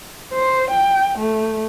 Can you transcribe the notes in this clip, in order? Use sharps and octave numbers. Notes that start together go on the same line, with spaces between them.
C5
G5
A3